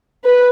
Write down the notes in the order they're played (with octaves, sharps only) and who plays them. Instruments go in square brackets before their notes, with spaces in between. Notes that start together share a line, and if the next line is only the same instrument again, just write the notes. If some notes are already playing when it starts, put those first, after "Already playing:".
[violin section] B4